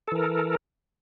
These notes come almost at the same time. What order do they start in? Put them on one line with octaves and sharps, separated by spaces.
A4 E3 A#4